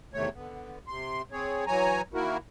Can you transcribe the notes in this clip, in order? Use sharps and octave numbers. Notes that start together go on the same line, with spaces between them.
E2 C3 D#3 A3 C#5
D3 B3
C3 C6
C4 G#4 C#5
E3 F#3 C#5 G#5 A#5
D#3 A#3 E4 F#4 A#4